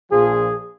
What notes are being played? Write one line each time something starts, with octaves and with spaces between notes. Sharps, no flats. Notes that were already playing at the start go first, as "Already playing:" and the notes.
A#1 A#2 F3 G#4